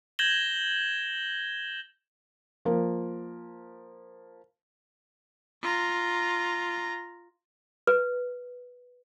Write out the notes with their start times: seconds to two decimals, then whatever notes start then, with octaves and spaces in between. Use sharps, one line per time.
0.19 G6 G#6 A#6 E7 F#7 G7
2.65 F3 A#3 A#4
5.62 F4 A#5
7.87 B4